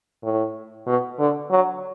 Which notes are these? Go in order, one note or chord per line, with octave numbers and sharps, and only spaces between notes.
A2
B2
D3
F#3